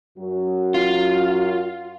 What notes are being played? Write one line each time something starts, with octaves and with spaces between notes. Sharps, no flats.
F#2 F#3 F#4
F4